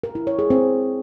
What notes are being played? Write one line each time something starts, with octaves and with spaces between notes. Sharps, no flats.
A#4
E4
C#5
G#4
C4